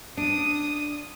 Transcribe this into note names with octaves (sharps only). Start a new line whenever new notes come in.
D4 D#6 D#7